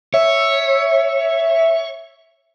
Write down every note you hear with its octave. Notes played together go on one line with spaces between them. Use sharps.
C#5 E5